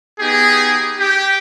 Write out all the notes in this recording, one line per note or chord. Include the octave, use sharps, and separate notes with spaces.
B3 D#4 G4 G#4
G4